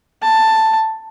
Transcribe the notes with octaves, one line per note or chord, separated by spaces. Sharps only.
A5